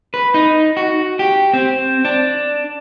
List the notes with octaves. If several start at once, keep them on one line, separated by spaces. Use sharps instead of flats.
B4
D#4
F#4
G4
C4
D4